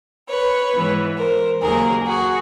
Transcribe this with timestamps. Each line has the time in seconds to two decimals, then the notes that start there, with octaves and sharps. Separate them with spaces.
0.28 B4 C#5
0.72 G#2 E3 G#3 B3
1.16 A#4 C5
1.61 D#2 C#3 F#3 A#3 G#4 A#4
2.05 F#4 G#4